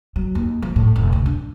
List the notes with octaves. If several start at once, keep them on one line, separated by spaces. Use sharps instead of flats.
F#3
D#2
F3
A2
F1
D2
D4